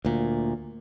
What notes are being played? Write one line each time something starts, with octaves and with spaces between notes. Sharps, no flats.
D2 A#2